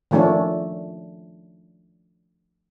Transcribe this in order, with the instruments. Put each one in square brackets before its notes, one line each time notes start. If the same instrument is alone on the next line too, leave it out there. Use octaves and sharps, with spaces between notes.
[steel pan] D#3 F3 A3 C#4 D4